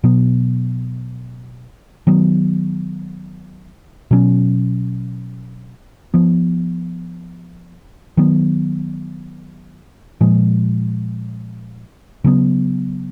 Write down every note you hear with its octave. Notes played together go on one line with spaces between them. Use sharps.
B2 F#3 B3
D#3 F#3 B3
B2 F#3 C#4
F3 B3
D#3 F#3 B3
A#2 F3 G#3
C#3 F#3 B3